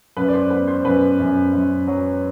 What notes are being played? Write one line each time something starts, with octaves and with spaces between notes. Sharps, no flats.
F#2 B4
D5
C5
B3 B4
C5
F#2 B4
F#2
F#2
F#3